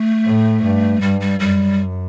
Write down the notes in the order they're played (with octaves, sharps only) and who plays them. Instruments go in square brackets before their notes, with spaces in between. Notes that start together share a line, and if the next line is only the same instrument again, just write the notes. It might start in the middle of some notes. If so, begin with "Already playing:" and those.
Already playing: [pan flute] A3
[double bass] A2
G2
[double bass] G2 [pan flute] G3
[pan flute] G3
[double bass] F#2 [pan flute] G3